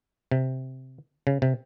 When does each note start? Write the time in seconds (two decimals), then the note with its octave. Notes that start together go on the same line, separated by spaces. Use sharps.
0.32 C3
1.27 C#3
1.42 C3